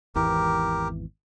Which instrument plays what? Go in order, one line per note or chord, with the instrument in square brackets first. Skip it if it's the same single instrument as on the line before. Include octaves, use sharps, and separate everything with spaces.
[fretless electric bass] G#1 E2 E3 [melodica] G4 A#4